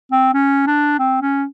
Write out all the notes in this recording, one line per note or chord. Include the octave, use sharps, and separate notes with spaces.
C4
C#4
D4
C4
C#4